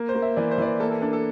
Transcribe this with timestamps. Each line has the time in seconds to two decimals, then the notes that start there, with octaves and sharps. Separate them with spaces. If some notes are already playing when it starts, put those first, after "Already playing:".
Already playing: A#3
0.09 C5
0.15 A#3
0.22 E5
0.36 E3 D5
0.51 C5
0.58 E3 D5
0.66 C5
0.80 A#3 A4
0.91 A4
1.02 D4 A4
1.13 A4